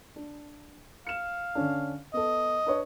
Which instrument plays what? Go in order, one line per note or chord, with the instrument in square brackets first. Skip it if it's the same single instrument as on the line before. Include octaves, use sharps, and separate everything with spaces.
[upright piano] D4
[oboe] F5 [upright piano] C#7 E7
[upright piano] D3 C#4 D4
[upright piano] B3 A4 [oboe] D#5
[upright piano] D4 B4 C#5